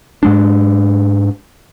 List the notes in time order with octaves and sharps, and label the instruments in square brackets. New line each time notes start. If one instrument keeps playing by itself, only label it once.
[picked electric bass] G#2 G#3 D4